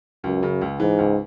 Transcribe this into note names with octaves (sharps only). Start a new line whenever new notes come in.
C#2 F#2
C#3
C#2
G#2 E3
C#2